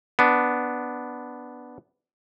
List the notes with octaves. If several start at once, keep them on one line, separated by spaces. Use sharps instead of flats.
B3 D4